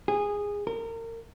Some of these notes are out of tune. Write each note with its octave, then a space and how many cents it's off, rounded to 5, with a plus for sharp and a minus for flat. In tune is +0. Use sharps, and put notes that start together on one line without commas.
G#4 -15
A#4 -30